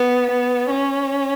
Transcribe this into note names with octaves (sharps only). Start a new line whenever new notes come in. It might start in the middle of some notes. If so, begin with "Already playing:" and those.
Already playing: B3
B3
C#4